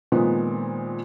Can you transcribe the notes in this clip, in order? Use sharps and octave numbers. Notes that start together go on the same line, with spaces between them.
A#2 D#3 F3 G#3 B3 C4